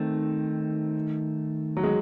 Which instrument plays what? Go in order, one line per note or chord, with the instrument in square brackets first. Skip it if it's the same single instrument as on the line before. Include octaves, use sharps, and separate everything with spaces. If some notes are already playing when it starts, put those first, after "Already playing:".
Already playing: [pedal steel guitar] D#3 A3 D#4 [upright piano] C4
[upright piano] F#3
G#3